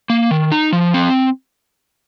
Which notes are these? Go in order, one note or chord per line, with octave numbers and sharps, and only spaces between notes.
A#3
D#3
D#4
F3
C4